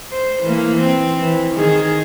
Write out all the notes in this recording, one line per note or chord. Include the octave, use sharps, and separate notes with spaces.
C5
E3 A#3
C4
E3
D#3 G#4